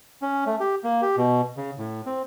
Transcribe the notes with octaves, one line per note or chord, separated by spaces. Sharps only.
C#4
A3
G4
A#3
G4
B2
C#3
A2
C4